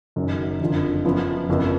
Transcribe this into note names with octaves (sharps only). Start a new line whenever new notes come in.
F#1 F#2 D#3 F#3
F#1 F2 D3 F3
F#2 F3 B3
F#1 F2 F3 B3